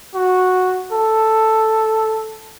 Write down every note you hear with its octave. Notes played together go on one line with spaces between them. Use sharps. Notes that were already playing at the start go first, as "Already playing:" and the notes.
F#4
A4